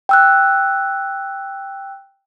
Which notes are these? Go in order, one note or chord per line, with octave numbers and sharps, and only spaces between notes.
G5 E6 F#6